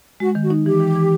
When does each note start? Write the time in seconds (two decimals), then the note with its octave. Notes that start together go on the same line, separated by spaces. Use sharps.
0.20 G#3 F#4
0.35 D#3
0.43 F#4
0.50 D#4
0.65 E3 G4
0.80 E3
0.95 E3